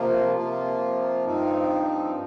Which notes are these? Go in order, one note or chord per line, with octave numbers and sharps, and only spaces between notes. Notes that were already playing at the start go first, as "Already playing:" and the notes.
Already playing: C3 F3 A#3 F4
C3 F3 A#3 F4
G2 F3 C4 D#4